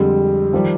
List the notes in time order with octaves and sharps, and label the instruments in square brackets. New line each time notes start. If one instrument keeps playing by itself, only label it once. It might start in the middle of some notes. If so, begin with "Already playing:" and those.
Already playing: [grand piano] F2 D3 G#3 [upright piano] G3
[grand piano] D#3 G3 [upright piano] F3